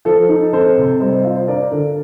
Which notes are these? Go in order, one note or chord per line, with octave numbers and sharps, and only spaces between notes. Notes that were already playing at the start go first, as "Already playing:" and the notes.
F3 A4
D#4
C4 A4 C5
C3
G3 C5 D#5
F4
C5
D4 A#4 D5
D3